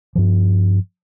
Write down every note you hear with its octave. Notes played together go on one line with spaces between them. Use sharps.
G2 F3